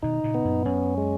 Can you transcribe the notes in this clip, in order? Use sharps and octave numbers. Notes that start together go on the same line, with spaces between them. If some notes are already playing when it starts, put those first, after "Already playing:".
B2 D#3 D#4
A#2 C#3
B3
F#2 A#2
F#2 C#4
G#3